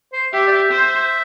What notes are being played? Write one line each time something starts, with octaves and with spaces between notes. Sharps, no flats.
C5
G4 E5
D5
E5
C5